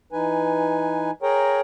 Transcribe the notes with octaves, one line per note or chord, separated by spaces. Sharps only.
E3 D#4 B4 G#5
G#4 A#4 C#5 G5 A#5